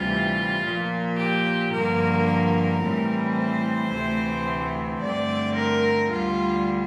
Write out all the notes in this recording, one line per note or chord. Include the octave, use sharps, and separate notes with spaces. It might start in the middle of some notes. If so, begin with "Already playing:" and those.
Already playing: D2 C3 E3 G3 F4
A#2 F3 A#3
G4
G2 D3 F3 A#3 A#4
A#4
A2 E3 G3 C4
C5
D2 C3 E3 A3 C4
G2 D3 A3 C4 D5
A#4
D2 D3 G3 F4